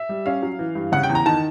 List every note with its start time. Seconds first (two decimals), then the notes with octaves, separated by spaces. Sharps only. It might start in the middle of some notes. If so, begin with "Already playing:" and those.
Already playing: E5
0.09 G3
0.26 C#4 F5
0.43 F#3
0.59 E3
0.75 G2
0.92 C#3 F#5
1.03 G5
1.09 E2
1.15 A#5
1.26 D#3 A5